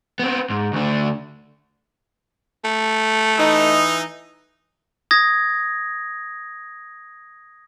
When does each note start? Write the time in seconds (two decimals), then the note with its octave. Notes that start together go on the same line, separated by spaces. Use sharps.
0.19 B3 C4
0.50 G#2
0.73 D2 D3
2.64 A3
3.38 E3 D#4
5.11 D#6 G#6 A#6